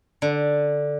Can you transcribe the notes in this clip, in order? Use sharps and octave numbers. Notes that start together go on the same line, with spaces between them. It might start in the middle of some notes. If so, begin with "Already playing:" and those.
D3